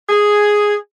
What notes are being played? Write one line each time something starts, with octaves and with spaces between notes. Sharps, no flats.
G#4